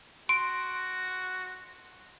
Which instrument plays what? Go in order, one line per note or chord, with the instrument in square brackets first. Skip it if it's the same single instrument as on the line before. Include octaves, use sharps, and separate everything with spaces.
[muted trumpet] F#4 [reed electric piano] C6 [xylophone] D7